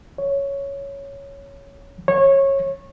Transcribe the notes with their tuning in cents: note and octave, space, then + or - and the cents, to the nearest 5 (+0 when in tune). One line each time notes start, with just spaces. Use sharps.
C#5 +5
C#5 -20